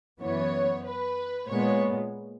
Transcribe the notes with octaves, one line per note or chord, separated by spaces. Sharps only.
F#2 E3 B3 C#5
B4
A#2 G#3 B3 C#5